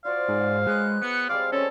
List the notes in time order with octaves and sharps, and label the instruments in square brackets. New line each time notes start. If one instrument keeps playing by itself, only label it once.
[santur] F4 F#4 C5 [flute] D5 [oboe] F5
[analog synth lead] G#2 [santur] G#4
[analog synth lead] G#3 [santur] B4 C#5 D#5 [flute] F#6
[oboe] B3 [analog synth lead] C#7
[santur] G3 G#3 C4 [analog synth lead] D5 [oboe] F5
[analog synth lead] C#4 [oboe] A4 [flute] C#5 [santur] A5 B5 E6